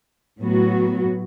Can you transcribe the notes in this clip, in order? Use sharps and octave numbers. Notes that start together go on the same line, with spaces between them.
A2 F#3 B3 F#4